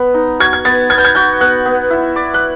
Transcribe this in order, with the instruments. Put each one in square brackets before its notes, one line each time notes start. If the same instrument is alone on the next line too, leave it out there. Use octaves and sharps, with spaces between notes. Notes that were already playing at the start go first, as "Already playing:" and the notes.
Already playing: [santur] B3
D#4
[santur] F#4 [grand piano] G#6
[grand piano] G#6
[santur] B3 [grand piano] A6
[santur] B3 [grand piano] G#6
[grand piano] G6
G#6
[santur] F#4 [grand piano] G6
[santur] B3 [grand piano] F#6
[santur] B3
E4
D5
[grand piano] F#6